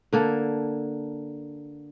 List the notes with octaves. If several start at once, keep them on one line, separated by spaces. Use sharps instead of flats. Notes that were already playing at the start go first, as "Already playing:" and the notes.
D3 A#3 A4